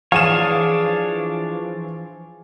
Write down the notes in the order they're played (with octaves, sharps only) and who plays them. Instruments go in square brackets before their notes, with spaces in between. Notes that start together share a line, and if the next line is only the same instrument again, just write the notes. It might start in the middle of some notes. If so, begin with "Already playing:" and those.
[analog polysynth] E3 F3 [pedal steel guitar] D4 C#5 [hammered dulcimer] G#4 [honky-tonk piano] F5 D#7 E7